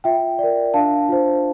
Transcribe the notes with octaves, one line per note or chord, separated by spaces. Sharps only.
F4 E5 G5
A#4 D5
D4 F5 A5
F4 C5